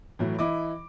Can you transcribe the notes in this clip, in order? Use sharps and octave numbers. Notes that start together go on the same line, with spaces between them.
A2 E3 F#3
E3 E4 D#5 D6